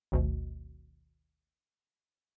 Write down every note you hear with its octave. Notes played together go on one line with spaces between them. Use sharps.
G#1 D2 B2